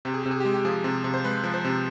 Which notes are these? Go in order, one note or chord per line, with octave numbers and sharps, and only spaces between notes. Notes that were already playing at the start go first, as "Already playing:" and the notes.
C3 G4
G#4
C3 G4
G#4
G4
G#3
G4
F3 G#4
C3
C3
C5
G#3 B4
F3
C5
C3